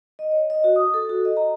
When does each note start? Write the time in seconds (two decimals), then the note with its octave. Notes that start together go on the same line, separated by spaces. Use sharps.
0.19 D#5
0.31 C#5
0.50 D#5
0.64 F#4
0.76 D#6
0.94 A4
1.09 F#4
1.25 D#5
1.37 A#5